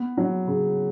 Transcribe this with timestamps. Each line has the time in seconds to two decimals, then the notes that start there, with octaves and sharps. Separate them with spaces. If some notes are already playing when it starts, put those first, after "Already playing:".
Already playing: B3
0.17 F#3
0.47 C#3